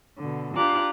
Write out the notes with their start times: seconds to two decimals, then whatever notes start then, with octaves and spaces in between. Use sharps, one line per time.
0.19 B2 D3
0.55 D4 F4 G4 A#5 D6 F#6